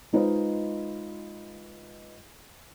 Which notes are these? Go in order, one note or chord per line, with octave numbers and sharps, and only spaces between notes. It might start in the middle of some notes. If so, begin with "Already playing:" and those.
G#3 D#4 F4 B4 C5 D#5